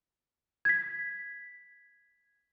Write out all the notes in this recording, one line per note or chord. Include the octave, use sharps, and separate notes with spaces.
G#6 B6